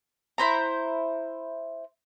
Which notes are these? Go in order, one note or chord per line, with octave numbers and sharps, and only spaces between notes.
E4 C5 A#5